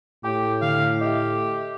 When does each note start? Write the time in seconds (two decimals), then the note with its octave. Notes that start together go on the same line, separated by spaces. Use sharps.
0.24 A2 G4 G5
0.62 D3 F5
1.01 G4 D#5 E5